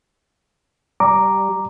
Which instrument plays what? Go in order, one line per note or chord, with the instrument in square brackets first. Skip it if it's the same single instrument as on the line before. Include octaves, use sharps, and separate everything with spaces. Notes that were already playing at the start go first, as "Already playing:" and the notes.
[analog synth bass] G3 [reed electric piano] A#5 D6